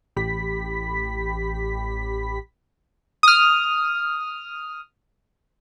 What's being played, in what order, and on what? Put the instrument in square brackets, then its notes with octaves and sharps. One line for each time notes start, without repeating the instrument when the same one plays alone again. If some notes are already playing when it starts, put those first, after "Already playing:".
[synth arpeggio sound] A1 G4 B5 B6
[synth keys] D#6 F6